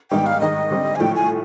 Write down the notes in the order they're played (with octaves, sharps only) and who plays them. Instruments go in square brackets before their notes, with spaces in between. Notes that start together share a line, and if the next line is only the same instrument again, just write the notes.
[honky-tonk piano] G#2 D#3 G3 B3 D#4 [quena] G5
[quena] F5
[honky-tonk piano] G#2 D#3 G#3 [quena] D#5
[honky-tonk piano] D3 G3 C4
[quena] G#5
[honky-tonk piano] A2 F3 A3 [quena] G5
[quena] G#5